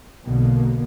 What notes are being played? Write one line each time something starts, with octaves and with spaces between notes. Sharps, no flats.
B1 B2 D3 A#3